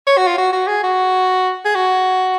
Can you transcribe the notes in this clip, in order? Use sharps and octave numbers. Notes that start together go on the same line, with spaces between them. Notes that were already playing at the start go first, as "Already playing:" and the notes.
C#5
F#4
F4
F#4
F#4
G#4
F#4
G#4
F#4